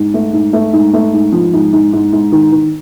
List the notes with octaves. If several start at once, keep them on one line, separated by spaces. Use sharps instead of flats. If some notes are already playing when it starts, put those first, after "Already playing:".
Already playing: G#2
A3
G#2
A3
G#2
A3
G#2
F3
G#2
G#2
G#2
G#2
D#3
D#3